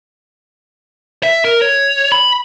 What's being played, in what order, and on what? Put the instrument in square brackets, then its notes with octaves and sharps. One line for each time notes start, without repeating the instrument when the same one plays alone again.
[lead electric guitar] E5
A#4
C#5
B5